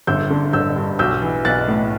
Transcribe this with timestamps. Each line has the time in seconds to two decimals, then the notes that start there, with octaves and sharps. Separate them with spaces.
0.07 G1 E6 G6
0.30 D3
0.53 G1 E6 G6
0.76 G2
0.99 B1 E6 G6
1.22 E3
1.45 B1 F#6 A6
1.68 A2